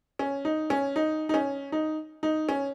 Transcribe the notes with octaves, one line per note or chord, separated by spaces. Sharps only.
C#4
D#4
C#4
D#4
D#4
C#4
D#4
D#4
C#4